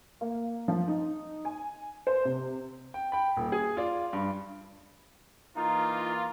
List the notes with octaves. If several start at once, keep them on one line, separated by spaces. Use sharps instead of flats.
A#3
F3
D#4
G#5
C5
C3
G5
G5 B5
D#1
G#4
F4 D5
G2
E3 A#3 D#4 F4